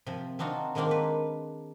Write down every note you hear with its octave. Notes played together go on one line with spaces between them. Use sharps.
C3 F3
C4 D4 D#4 F4 F#4
D#3 G#3 A#3 C4 D4 D#4
B4